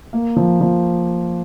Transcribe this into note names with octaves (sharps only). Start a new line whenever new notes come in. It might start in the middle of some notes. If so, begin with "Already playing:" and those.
A#3
F3
F3